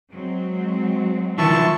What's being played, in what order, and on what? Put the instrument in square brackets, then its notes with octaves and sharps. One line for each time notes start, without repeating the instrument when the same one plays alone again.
[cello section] F#3 G#3 C4
[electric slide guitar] D#3 F3 E4 [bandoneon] A5 C#6 E6